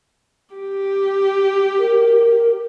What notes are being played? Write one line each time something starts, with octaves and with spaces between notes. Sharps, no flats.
G4
A#4